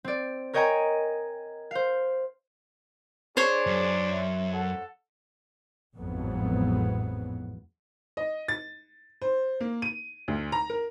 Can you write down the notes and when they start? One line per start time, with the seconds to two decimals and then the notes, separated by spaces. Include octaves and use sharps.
0.04 C4 D5
0.53 A#4 C#5 D#5 G5 G#5 A#5
1.71 C5 F5
3.37 D4 G#4 C5 C#5
3.67 F#2
4.10 E5
4.53 A4 F#5
5.96 A1 F2 G#2 F#3 B3
8.17 D#5
8.48 A6
9.22 C5
9.60 A#3
9.82 D#7
10.28 D2
10.52 A#5
10.70 A#4